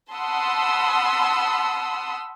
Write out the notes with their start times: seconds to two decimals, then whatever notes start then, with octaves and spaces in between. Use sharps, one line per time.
0.13 F#5 A5 B5 C6 D#6 E6